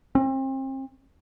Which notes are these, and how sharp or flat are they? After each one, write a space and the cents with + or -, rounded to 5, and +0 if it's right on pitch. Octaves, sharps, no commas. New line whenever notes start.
C4 +35